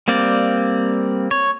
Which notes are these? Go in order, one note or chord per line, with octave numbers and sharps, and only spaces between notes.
G3 A#3 C4 D5
C#5